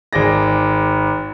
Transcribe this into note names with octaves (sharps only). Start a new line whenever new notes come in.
G#1 G#4 D5 A#6